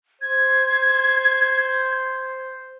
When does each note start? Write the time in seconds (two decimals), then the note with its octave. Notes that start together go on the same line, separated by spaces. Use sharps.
0.22 C5 G#6